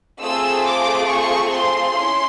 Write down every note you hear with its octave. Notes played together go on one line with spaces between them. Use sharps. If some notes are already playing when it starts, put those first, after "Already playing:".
A3 C4 F4 G#4 E6
D6
C#6
C6
C#4 E4